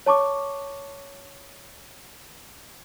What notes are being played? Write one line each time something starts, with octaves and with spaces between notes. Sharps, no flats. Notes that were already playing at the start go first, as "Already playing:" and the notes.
C#5 A5 C#6 D6